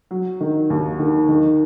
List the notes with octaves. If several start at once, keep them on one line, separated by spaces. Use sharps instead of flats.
F#3
D#3
D#2
D#3
D#3